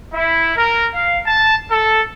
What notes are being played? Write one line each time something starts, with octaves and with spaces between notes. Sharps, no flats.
E4
A#4
F5
A5
A4